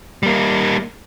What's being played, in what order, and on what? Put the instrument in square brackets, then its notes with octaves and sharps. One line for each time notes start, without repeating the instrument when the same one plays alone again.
[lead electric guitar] G3 A#3